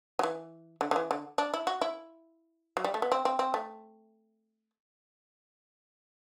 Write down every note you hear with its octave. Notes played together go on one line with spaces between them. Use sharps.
F#3
E3
D3
D3
E3
D3
D4
E4
F#4
E4
F#3
G3
A3
B3
C4
C4
C4
A3